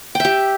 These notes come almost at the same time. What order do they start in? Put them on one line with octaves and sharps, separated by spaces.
G5 E5 G4